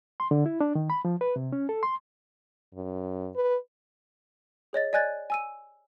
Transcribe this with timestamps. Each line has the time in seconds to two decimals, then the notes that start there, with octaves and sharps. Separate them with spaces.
0.20 C6
0.31 D3
0.46 E4
0.61 D4
0.75 D#3
0.90 B5
1.05 F3
1.21 B4
1.36 C3
1.53 C#4
1.69 A4
1.83 C6
2.74 F#2
3.36 B4
4.73 G#4 C#5 D#5 A6
4.93 D5 D#5 G#5 F#6 G#6 A6
5.30 G#5 E6 D#7